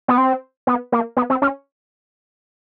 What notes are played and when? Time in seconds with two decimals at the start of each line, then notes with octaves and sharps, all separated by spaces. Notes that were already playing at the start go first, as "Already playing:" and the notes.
0.08 B3
0.18 C4
0.67 B3
0.92 A#3
1.17 B3
1.30 C4
1.42 C#4